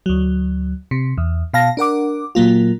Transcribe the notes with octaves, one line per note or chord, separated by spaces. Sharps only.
D2 F#3
C3
E2
B2 F5 A5 A#6
D4 A#4 F#5 D6
A#2 F#3 A#3 F4